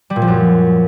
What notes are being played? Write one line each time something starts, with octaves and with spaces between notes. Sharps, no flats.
G3
A#2
F3
F#2